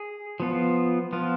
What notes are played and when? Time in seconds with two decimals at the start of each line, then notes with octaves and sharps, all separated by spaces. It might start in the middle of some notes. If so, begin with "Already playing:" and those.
Already playing: G#4
0.40 F3 B3 F4
1.13 F3 B3 F4